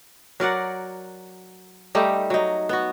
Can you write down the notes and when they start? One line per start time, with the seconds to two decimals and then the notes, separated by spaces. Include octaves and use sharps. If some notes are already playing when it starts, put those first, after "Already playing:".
0.40 F#3 A#4 D5 F#5
1.95 G3 A3 D#4 G4
2.30 F#3 D#4
2.69 B3 F#4